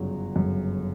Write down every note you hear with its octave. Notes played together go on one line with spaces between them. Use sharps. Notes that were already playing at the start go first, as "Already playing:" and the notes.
Already playing: G1 F#2 C#3 F#3
G1 F#2 C#3 F#3